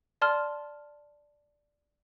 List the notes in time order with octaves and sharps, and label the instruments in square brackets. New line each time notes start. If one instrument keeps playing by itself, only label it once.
[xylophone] D5 A5 C6 F6